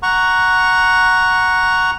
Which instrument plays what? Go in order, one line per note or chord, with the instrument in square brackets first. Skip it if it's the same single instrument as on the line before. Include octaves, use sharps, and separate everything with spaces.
[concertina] F#5 A#5 C#6